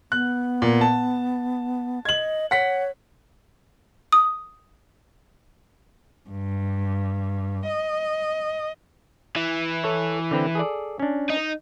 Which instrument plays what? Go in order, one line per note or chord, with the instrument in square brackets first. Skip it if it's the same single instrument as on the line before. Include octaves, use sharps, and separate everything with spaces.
[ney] B3 [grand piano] F#6
[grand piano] A#2
A5
[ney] D#5 [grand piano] G#6 F#7
[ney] C#5 [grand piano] F#5 B6
[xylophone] D#6
[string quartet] G2
D#5
[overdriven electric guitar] E3
[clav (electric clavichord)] A4 C#5
D3 C4 B4
G#4 A4 D5
C#4 D4
[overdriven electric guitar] D#4